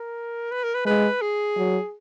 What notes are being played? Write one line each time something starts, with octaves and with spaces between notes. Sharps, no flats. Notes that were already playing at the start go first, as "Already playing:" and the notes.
Already playing: A#4
B4
A#4
B4
G#3 B4
G#4
F#3